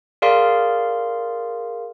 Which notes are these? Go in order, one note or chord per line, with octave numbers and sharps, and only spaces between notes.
G#4 A#4 D5 F5 C6